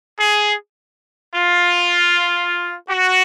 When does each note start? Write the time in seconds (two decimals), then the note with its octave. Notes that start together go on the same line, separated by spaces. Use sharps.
0.20 G#4
1.35 F4
2.89 F#4